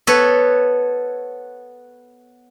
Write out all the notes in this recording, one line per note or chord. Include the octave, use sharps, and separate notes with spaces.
B3 A4 B4 C#5